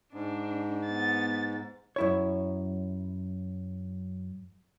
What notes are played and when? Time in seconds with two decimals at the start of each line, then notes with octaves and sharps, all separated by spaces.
0.13 G#2 D4
0.86 B3 A6
1.96 F#2 E4 C#5